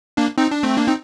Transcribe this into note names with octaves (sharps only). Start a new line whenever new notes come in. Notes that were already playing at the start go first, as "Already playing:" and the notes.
A#3 D4
C4 D#4
D4
A3 C4
A#3 D4
C4 D#4